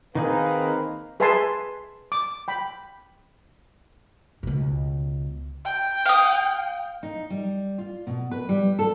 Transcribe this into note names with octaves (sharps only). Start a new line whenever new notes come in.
D#3 A#3 C4 D#4 G#4 B4 F5
G#4 B4 E5 G#5 A5 C6
D6
G5 B5
C#2 B2
G5
F5 D#6
D#4
G3
F4
B2
B4
G3
A4